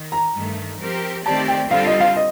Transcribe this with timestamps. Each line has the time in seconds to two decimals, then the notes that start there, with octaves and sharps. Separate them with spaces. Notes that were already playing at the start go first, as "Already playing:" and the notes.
Already playing: D#3
0.12 A#5
0.34 G2 D#3 A3
0.80 F3 C4 G4 A#4
1.24 D#3 A3 C4 G4 D5 A5
1.48 G5
1.70 D3 G3 C4 F4 A4 F5
1.86 D#5
2.00 F5
2.16 D#5